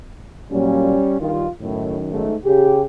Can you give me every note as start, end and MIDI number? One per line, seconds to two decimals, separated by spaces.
0.51 0.96 46
0.51 0.96 54
0.51 1.18 55
0.51 1.18 61
1.20 1.45 43
1.20 1.45 51
1.20 1.48 65
1.61 2.28 42
1.61 1.98 45
1.61 2.28 51
2.10 2.35 44
2.10 2.35 57
2.45 2.85 49
2.45 2.82 67
2.45 2.85 68